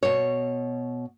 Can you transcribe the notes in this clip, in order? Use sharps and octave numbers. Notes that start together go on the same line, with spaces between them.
B2 C#5